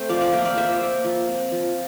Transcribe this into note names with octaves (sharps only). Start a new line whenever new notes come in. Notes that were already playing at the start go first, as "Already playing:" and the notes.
Already playing: A3 C4 C5
F3 D5 F5
D5 F5
A#3 E5 G5
D5 F5
F3 C5 E5
A#3
F3
C4
F3